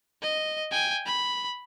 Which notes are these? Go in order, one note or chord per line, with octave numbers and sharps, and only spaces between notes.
D#5
G5 G#5
B5